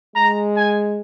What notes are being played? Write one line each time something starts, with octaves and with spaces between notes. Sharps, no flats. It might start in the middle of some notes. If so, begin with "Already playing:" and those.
G#3 A#5
G#5